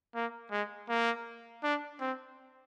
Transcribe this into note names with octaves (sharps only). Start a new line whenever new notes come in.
A#3
G#3
A#3
D4
C4